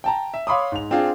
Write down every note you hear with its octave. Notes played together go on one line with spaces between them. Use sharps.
G5 A5 A#5
E5
C#5 F5 B5 C6 D6 D#6
G#2 F7
C4 D4 F4 G#4